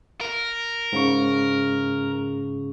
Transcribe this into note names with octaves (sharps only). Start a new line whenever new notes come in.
A#4
G#2 C#3 C#6